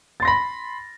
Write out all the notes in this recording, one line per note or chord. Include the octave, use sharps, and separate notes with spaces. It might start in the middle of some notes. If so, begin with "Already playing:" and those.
B5 C6 A6 A#6